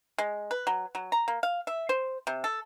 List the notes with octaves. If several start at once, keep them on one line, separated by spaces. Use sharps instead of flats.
G#3
B4
F#3
F#3
A#5
A#3
F5
E5
C5
C3
A4